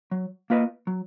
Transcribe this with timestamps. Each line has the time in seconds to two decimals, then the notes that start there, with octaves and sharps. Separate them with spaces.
0.11 F#3
0.50 A#3 F4 B4 D#5
0.87 F#3